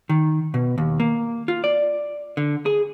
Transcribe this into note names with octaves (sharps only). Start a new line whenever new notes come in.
D#3
B2
D#2
A#3
F4
D5
D3
G#4